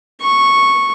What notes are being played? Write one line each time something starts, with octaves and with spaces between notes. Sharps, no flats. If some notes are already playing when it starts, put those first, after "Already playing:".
C#6